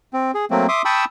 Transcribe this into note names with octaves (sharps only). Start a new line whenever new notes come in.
C4
G#4
F#3 A3 A#3 C4
E5 C6 D6 D#6
G5 A5 B5 C#6 D#6 E6